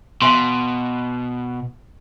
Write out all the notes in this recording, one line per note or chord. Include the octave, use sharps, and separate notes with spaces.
B2 F5 G#5 C6